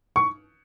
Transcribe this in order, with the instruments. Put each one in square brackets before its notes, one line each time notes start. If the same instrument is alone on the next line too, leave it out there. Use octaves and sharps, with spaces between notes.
[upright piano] C#6